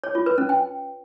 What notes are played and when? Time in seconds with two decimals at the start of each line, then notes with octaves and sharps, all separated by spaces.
0.04 C#5
0.15 F4
0.26 B4
0.38 C#4
0.49 G5